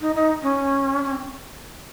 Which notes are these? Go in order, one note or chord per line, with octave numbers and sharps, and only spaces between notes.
D#4
D#4
C#4
C#4
C4